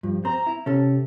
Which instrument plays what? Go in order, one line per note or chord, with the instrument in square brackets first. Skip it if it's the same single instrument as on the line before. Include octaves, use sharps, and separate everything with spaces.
[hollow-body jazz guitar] G2 [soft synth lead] F3
[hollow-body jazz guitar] C4 C5 [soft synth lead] A#5
[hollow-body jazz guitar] E4
[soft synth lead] C3 [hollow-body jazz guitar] C#4 A4